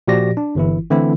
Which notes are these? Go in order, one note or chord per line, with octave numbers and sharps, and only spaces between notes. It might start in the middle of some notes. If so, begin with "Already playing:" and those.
A#2 F3 F#4 G4 D5 A#6
D4
G1 E3 E4
D3 E3 A3 C4 E4